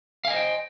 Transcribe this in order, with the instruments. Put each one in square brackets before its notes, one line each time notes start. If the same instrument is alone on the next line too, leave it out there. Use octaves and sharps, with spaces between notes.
[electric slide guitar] F5
G#5
D#5
C5
G5